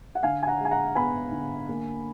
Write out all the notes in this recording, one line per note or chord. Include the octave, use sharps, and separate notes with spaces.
F#5
D3 F5 G#5
G#5
F#5 A#5
G#3
G#5
F#5 A#5
B3 G#5 B5
D3
A#3